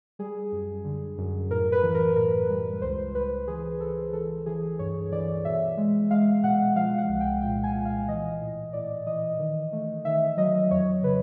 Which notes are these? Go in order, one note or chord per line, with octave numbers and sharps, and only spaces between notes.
G3 G#4
F#2
D3
F#2
A2 A#4
B4
E3
A#4
A2 A#4
G3
C#2 C5
C#2 B4
E3 G#4
C#2 A4
E3 A4
E3 G#4
G2 C#5
E3 D5
B2 E5
G#3
G#3 F5
B2 F#5
F3 F5
F#5
C2
G5
A#2 G5
G#5
A#2
F5
E3 D#5
A2
A2 D5
E3 D#5
D#3
A3
D#3 E5
F#3 D#5
F2 C#5
C#3 B4